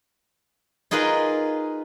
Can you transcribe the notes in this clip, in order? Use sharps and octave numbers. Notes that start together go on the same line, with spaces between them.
D#4 F4 G#4 A#4 B4